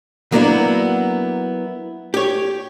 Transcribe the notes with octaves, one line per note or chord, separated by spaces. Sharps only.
F#3 A#3 B3 D4 E4
G4 C#5